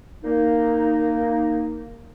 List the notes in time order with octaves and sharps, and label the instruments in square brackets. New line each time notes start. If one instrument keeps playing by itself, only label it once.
[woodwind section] A#3 D#4